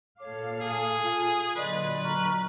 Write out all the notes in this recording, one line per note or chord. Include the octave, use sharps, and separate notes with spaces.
A#2 A4 C#5 F5 D6
G#4 A5
F4
A#2 D3 F#3 B4 D5 D#5 C6
A#5 C#6 F6